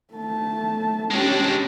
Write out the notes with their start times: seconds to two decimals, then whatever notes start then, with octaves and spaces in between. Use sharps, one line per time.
0.14 A3 A5
1.11 G#3 C#4 D4 G4